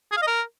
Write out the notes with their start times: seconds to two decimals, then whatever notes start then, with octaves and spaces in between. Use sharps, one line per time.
0.12 G#4
0.17 F5
0.22 D#5
0.27 A#4